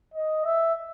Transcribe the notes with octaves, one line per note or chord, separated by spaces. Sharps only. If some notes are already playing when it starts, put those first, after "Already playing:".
D#5
E5